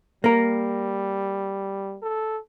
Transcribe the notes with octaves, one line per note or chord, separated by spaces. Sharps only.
G3 A#3 A#4
A4